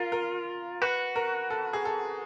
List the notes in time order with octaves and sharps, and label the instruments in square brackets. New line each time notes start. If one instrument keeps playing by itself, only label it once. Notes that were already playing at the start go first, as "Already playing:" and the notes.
Already playing: [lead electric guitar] F4 [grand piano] A#4
[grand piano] A#4
[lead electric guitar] F#4 [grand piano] B4
[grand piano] A#4
A4
G#4
A4